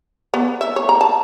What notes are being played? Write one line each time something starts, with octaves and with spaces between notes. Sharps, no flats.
B3
E5
C#5
A#5
A5